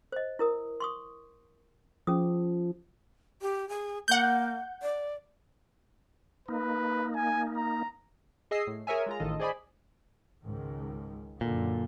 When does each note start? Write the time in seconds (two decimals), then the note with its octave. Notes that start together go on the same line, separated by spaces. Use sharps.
0.12 C5 D#5
0.39 E4 A#4 D#6
0.80 C6 C#6 D#6
2.07 F3 C#4 G#4 D#6
3.42 G4
3.69 G#4
4.08 A#3 F#5 G6
4.82 D5
6.48 A#3 D#4 B4
7.16 G#5
7.57 A#5
8.51 G#4 D#5 E6 C7
8.67 A2
8.87 G#4 A#4 C#5 E5 G#5
9.06 G#3 F4 A#5
9.20 A1 D#3 F4 A4 D#5
9.40 G#4 C5 D5 D#5 G#5 B5
10.44 C#2 G#2 D#3
11.41 F#2 A#2 D3